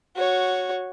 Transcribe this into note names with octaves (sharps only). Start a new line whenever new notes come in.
F#4 C#5